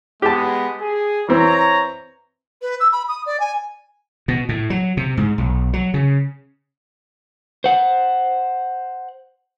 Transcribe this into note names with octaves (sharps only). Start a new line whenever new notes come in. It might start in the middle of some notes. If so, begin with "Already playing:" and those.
G#3 B3 G4 A5
G#4
E3 C4 C#5 A#5
B4
E6
B5
D#6
D5
G#5
B2
A2
F#3
C3
G#2
B1
F#3
C#3
C5 F#5